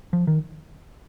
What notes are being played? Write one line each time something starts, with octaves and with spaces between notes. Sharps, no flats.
F3
D#3